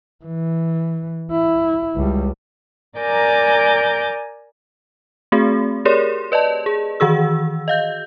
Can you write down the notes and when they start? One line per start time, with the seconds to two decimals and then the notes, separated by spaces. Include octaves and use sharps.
0.25 E3
1.32 E4
1.96 C#2 G3
2.99 A#4 D5 G#5 A#5 D6 G6
5.32 A3 C4 F#4 G#4
5.85 G4 G#4 A#4 C#5 D5 C6
6.32 B4 D5 D#5 A5
6.66 G#4
7.00 D#3 E3 F#4 G#4 E6
7.68 D#5 F5 G6